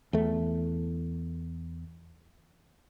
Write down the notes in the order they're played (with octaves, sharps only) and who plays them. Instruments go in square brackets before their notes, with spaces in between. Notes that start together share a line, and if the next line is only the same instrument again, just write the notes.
[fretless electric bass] E2 A3